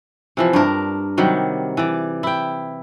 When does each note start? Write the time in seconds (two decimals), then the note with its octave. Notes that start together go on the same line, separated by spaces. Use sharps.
0.37 C3 E3 F3
0.53 G2 D4 A#4
1.18 C3 D#3 F#3 G3
1.77 E3 D5
2.23 E4 G5